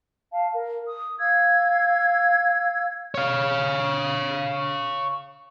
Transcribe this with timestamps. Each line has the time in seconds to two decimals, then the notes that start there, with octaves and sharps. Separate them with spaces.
0.32 F5 A5
0.54 A#4
0.88 D#6
1.19 F5 E6 G#6
3.14 C#5 F5